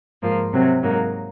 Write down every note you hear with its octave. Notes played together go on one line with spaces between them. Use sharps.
G#2 F3 A#3 F4
C3 F#3 C4
G#2 F#3 A#3 D#4